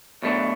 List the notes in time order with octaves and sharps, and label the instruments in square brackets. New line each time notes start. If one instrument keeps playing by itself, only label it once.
[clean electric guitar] B1 B2 A3 D4